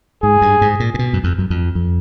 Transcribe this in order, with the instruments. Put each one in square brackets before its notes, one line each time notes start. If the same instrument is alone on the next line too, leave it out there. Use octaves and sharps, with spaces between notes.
[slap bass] G#2 [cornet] G#4
[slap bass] G2
G#2
A#2
A#2
B2
F#2
F2
F#2
F2
F2